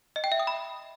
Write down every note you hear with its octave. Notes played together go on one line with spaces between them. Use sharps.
D#5
G5
E5
D#6
B5